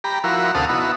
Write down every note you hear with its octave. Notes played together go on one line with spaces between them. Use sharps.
G4 A#5 B5
F3 E4 F#4 A#4
D2 C3 A4 F5 F#5 D#6
B3 D#4 E4 F#4